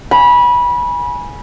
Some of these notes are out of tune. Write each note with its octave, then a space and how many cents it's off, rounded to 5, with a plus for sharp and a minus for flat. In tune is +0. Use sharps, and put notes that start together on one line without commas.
G#5 +0 B5 -25